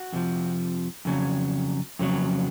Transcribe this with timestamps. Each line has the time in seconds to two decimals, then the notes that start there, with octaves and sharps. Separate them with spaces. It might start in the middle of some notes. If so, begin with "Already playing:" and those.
Already playing: F#4
0.13 F2 C3 F3
1.05 F2 C#3 F#3
1.99 F2 C#3 F#3